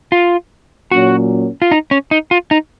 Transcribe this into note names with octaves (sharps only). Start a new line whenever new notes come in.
F4
A#2 F#3 A#3 C#4 F#4
F4
D#4
C#4
D#4
F4
D#4